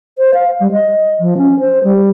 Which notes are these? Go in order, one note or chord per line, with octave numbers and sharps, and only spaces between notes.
C5
F5
G3
D#5
F3
C#4
C5
G3